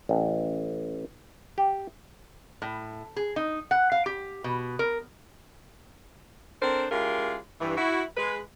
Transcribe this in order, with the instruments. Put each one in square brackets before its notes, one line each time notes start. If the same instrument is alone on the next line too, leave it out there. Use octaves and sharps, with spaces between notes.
[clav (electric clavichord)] A1
G4
[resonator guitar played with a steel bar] A2
G#4
D#4
F#5
F5
G4
B2
A#4
[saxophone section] C4 D4 A4 A#4 C5
G#3 C#4 E4 F4 G4 A#4
G2 E3
E4 F#4
G#3 B4